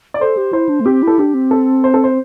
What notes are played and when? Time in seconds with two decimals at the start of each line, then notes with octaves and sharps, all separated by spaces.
0.14 D5
0.20 A4 C5
0.37 G4
0.53 E4 C5
0.69 D4
0.81 A3
0.86 C4 G4
1.03 E4 A4
1.19 D4 G4
1.34 C4
1.51 A4
1.84 C5
1.94 A4
2.04 C5